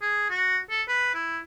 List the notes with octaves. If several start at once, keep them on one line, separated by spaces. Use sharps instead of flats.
G#4
F#4
A4
B4
E4